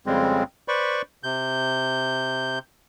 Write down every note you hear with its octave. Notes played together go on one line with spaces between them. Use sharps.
F2 C#3 G3 G#3 C4
B4 C5 D5 B5 C#6
C3 G6